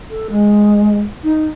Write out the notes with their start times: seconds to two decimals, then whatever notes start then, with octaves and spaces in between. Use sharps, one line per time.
0.10 A4
0.29 G#3
1.23 D#4